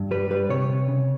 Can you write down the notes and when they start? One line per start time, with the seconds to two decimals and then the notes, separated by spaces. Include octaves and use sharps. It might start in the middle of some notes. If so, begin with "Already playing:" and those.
Already playing: G2
0.11 G3 B4
0.30 G3 B4
0.49 C3 C#5
0.69 C3
0.88 C#3